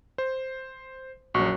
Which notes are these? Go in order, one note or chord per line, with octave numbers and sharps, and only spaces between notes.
C5
A#1 F#2 F#4 C#6